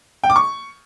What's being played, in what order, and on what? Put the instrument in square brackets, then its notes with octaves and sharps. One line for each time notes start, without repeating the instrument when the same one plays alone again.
[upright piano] G5
D6
C#6